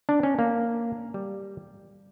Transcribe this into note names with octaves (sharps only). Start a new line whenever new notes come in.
D4
C#4
A#3
G3